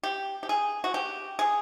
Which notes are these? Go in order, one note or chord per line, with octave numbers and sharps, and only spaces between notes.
G4
G4
G#4
F#4
G4
G#4